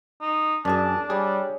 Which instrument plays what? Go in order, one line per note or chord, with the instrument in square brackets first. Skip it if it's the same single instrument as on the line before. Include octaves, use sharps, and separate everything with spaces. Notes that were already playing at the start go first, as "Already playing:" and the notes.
[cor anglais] D#4
[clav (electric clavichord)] F#2 G#5 [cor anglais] D4 [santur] G#4 D5 [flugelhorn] A5
[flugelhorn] G3 [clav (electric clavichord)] G#4 [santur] C#5